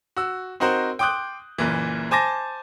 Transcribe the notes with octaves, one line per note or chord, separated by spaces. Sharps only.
F#4 E6
C4 D#4 F#4 A#4 C5
G5 C6 D6 D#6 F#6 G6
F#1 A#2 E3
C5 G#5 A5 D6 A6 A#6